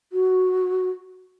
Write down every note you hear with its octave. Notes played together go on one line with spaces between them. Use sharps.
F#4